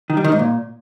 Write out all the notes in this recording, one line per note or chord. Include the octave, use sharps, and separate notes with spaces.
D#3
G3
D#3
G#2
A#2